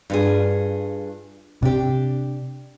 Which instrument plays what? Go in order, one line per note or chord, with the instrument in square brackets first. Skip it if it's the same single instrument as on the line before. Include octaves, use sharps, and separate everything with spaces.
[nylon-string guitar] G2 F4 G#4
[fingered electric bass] C3 [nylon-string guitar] D4 G4